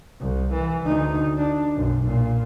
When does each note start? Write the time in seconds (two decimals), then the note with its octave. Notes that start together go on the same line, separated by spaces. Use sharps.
0.20 C2
0.53 E3
0.86 D2 D#4
1.38 D4
1.75 B1 F#2
2.06 A#2